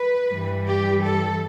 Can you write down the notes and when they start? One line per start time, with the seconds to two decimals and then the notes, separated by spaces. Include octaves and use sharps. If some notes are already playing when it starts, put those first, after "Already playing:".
Already playing: B4
0.28 G2 E3 G3
0.66 G4
1.04 A4